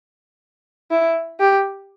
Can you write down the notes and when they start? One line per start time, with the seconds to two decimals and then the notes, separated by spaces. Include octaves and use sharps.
0.91 E4
1.40 G4